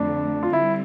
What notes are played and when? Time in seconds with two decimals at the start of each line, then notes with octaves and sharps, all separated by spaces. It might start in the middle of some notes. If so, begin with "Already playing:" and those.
Already playing: F2 D3 A3 D4
0.43 F4
0.52 D3 G3 C4 E4